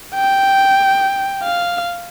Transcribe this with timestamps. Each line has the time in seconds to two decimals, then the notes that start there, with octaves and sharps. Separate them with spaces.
0.15 G5
1.43 F5